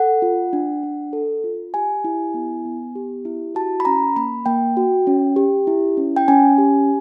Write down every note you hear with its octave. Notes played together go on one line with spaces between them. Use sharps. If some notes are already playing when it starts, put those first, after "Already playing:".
Already playing: A4 F#5
F4
D4
D4
A4
F4
G4 G#5
E4
B3
B3
G4
E4
F#4 A5
B5
C#4 A#5
A#3 B5
A#3 G5
F#4
C#4
G4
E4
C#4
G5
C#4 G#5
G4